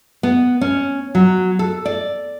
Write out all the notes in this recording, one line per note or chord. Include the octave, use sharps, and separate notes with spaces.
B3
C#4
F#3
A4
D5